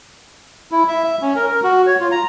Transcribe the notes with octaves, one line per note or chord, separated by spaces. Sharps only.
E4
E5
E5
C#4
A#4
A#4
F#4
C#5
F4
A#5